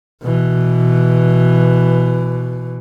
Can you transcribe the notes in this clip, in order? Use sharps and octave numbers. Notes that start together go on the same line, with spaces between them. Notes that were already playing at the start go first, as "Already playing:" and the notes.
B2 E3